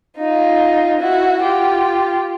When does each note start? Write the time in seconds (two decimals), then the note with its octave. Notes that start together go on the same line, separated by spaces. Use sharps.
0.17 D#4 F4
1.00 E4 F#4
1.42 F4 G4